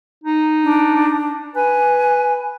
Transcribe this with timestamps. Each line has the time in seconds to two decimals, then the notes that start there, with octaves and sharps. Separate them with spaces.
0.24 D#4
0.64 D4
1.56 B4 G#5